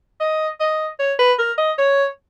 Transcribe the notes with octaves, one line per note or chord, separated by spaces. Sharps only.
D#5
D#5
C#5
B4
A#4
D#5
C#5